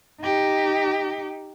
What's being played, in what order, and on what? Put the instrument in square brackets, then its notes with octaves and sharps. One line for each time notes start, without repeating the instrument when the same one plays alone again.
[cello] D#4 G4